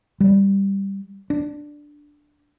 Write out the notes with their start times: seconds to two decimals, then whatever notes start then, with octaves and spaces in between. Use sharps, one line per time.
0.20 G3
1.30 D4